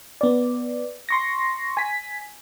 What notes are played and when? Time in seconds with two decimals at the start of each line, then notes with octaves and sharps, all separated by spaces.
0.21 B3 D5
1.09 C6 C#6 A#6
1.77 G#5 B6